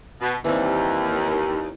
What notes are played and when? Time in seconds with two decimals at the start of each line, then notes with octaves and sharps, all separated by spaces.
0.21 B2
0.44 D#2 E3 G3 C4